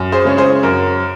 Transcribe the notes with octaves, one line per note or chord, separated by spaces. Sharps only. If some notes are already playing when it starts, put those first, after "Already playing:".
Already playing: F#2
G#4 C5
C#3 G#3 C#4
G#4 C5
F#2 A#4